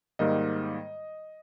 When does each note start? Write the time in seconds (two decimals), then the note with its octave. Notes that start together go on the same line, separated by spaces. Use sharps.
0.19 G#2 D#3 G3 A#3 D#5